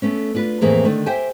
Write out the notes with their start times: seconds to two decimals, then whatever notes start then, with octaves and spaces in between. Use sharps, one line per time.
0.02 A3 B3 C#4
0.35 D4 F4 B4
0.61 F2 A2 E3 A#3 G#4 A#4
0.84 D3 D#3 A3 D4
1.06 G4 C5 E5 G5 G#5